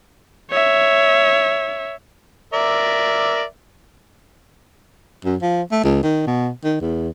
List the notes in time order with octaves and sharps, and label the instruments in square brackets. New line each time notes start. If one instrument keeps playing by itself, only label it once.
[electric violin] C#5 E5
[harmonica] A#4 D5 E5
[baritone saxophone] F#2
F3
A3
C#2
D#3
B2
D#3
E2